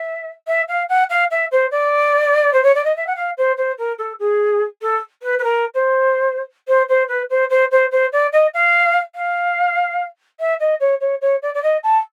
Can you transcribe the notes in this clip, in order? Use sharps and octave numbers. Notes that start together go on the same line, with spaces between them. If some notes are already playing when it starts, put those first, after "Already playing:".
Already playing: E5
E5
F5
F#5
F5
E5
C5
D5
C5
C#5
D5
D#5
E5
F#5
F5
C5
C5
A#4
A4
G#4
A4
B4
B4
A#4
C5
C5
C5
B4
C5
C5
C5
C5
D5
D#5
F5
F5
E5
D#5
C#5
C#5
C#5
D5
D5
D#5
A5